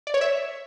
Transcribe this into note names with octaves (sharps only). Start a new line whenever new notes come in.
D5
C#5
E5